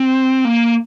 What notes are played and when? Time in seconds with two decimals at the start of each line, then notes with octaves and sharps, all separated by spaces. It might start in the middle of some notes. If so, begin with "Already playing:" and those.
Already playing: C4
0.45 A#3